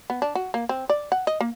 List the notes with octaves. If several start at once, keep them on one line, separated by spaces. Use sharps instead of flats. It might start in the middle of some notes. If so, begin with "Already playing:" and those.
B3
D4
F#4
A#3
C4
D5
F#5
D#5
A#3